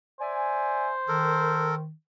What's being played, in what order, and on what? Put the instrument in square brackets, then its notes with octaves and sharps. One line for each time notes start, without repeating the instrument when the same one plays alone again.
[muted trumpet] C5 [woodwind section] D5 E5 G#5
[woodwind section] D#3 [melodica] A4 A#4